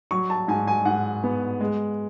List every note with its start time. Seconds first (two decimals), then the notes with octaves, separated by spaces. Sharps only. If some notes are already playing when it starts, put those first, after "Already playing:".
0.11 F#3 C#6
0.30 A5
0.48 G#2 G#5
0.67 G#5
0.85 G#2 F#5
1.24 B3
1.60 G#3